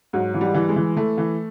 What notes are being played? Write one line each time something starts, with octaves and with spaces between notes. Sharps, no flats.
G#2 F#3
E3
G3
E3
G#3
E3
E3 A3
E3